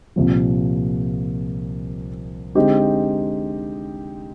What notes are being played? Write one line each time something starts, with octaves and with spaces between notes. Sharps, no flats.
C2 A#2 F3
D3 G#3 C4 D#4 G4